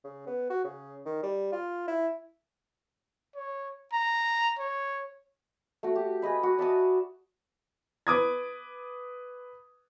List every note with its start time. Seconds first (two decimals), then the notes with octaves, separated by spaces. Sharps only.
0.04 C#3
0.27 B3
0.50 F#4
0.64 C#3
1.05 D#3
1.23 G3
1.53 F4
1.88 E4
3.35 C#5
3.93 A#5
4.59 C#5
5.83 A3 F#4
5.95 G4
6.22 G#4 B4 D#5 B5
6.43 F#4
6.59 D5 E5 A5 D#6
8.07 B4 D6 D#6 G#6